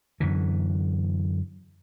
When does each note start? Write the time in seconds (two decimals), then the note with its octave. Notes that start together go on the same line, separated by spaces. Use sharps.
0.20 F#2 D3 E3